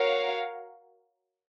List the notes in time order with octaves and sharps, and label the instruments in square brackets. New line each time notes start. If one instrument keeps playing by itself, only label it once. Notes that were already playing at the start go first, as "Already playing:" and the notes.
Already playing: [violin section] F#4 A#4 C#5 F5